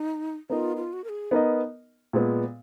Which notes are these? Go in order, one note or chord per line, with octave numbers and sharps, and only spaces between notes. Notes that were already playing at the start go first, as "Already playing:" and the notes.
Already playing: D#4
B3 D#4 F4 A#4 D#5
F4
F#4
A#4
G#4
B3 D#4 A#4 D#5
A#2 G#3 B3